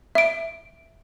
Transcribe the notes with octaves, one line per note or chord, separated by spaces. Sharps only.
E5 D7